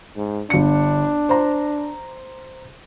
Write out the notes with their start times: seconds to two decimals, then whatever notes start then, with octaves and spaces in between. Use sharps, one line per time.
0.16 G#2
0.50 G1 D4 C#7
1.29 C5 A#5